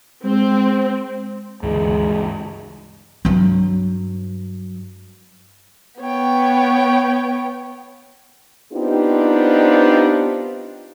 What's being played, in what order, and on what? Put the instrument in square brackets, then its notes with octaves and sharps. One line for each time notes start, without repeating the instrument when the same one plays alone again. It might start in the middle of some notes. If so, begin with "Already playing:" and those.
[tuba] G#3 [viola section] C4
[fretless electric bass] D2 [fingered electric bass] G2 C#3 E3 [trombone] G#3
[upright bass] G2 F#3
[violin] B3 [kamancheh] C#5 G5
[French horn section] B3 C4 D4 D#4 F4 G4